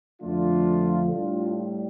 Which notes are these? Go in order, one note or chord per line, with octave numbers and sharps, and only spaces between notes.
F2 D3 F3 A3 D4 F4
A2 G3 D4 F4